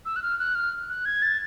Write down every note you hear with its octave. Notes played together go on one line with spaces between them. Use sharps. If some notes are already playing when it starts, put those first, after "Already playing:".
E6
F#6
F6
F#6
F6
F#6
G#6
A6